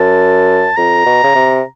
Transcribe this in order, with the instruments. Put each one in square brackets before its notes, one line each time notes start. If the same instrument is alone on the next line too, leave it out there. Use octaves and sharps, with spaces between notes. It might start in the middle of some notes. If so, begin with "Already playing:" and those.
Already playing: [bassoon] F#2 [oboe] A5
[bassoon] F2 [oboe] A#5
[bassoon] B2
C#3
C3